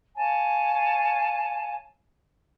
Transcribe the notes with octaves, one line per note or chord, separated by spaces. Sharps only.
C#5 F5 G#5 A5